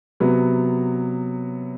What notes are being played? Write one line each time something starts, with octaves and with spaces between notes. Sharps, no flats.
C3 F#3 B3